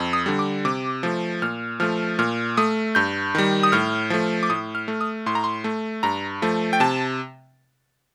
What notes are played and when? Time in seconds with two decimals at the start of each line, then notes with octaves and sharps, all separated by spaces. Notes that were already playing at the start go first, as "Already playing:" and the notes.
Already playing: F2
0.13 D#6
0.26 D3 G3
0.39 D6
0.65 C3 D6
1.03 F3 A3
1.42 A#2 F6
1.80 F3 A3 F6
2.19 A#2 F6
2.57 A3 D#6
2.95 G2 G6
3.35 D#3 G3
3.63 D#6
3.72 A2 F6
4.10 F3 A3
4.43 D6
4.50 A2 D#6
4.75 F6
4.88 A3
5.01 D#6
5.26 A2 C6
5.35 A#5
5.44 C6
5.64 A3
6.03 G2 A#5
6.42 F3 A3
6.73 G5
6.80 C3 A5